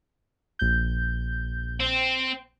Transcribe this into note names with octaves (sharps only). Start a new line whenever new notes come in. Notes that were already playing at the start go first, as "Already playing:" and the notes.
A#1 G6
C4